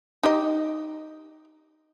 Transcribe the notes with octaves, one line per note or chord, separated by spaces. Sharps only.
D#4 G4 D#5